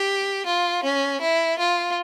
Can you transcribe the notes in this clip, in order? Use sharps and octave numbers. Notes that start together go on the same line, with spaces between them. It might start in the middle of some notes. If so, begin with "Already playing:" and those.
Already playing: G4
F4
C#4
E4
F4